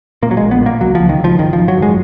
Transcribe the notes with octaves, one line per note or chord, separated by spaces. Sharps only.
A#2 A#3
F#3
A#1 G#3
B3
A#2
A#3
C#2 F#3
C#2 F3
D#3
C#2 F3
G#1 D#3
F3
G#1
F#3
F#2 G#3